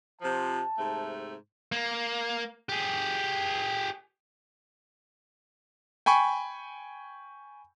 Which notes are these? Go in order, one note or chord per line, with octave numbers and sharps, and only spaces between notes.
C3 F3 A5
G#2 C3 A3
A#3
G4 G#4
G5 G#5 B5 C#6